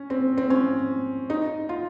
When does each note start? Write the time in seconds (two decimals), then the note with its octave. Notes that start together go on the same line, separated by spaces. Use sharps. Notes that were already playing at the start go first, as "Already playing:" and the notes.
Already playing: C#4
0.10 C4
0.38 C4
0.50 C#4
1.30 D#4
1.69 F4